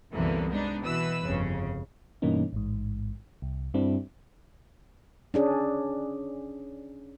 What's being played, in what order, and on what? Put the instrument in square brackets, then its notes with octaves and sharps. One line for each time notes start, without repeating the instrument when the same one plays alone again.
[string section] C2 F#2 D3 E3 A#3 B3
G#3 B3 D4 D#4
B2 E3 B4 E6
G1 F2 C#3
[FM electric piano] G2 B2 E3 A#3 C#4 D#4
A1 G#2
C2
G2 G3 C4 D4 E4
[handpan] C#4 D4 G#4